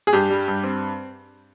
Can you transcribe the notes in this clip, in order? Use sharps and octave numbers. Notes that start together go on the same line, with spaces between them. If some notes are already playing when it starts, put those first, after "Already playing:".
G#4
G2 G4
G3
G2
C4